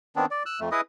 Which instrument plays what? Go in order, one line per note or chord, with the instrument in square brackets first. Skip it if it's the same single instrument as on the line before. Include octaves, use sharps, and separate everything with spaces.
[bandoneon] D#3 B3 C4 D4
D5
E6 F#6
F2 A3
E4 G#4 B4 D#5 D#6